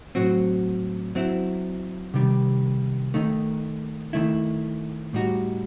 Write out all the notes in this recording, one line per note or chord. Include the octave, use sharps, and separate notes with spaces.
A2 F#3 C4 F#4
F#3 C4 E4
C3 D#3 G3
D#3 A3 D#4
D#3 A3 E4
A2 G3 D#4 F#4